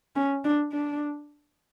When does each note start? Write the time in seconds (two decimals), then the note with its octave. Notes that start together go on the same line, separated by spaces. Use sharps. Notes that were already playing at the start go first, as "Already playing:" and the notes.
0.16 C#4
0.44 D4
0.72 D4